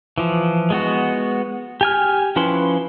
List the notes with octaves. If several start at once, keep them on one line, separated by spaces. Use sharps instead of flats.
E3 F3
G#3 B3 F#4
G4 G#5 F6
F3 C#4 E4 B4 C6